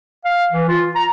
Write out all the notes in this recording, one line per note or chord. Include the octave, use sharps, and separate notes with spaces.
F5
E3
F4
A#5